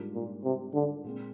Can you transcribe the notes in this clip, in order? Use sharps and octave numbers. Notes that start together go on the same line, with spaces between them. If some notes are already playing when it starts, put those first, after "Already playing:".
Already playing: G#2 G3 D4 F4 A#4
A#2
C3
D3
A#2 G#3 C4